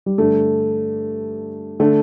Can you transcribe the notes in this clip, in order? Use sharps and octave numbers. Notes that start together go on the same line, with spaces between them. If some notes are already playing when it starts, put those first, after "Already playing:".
G3
G2 D3 A3
D3 A3